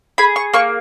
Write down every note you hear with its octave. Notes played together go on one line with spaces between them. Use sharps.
G#4 B5
C#6
A#3 C#6